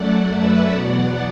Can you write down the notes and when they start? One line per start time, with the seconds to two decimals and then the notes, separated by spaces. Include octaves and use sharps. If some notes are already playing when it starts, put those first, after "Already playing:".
Already playing: F#2 F#3 A3 D5 F#5
0.34 B4 E5
0.70 E2 B2 F#3 B3 D5 F#5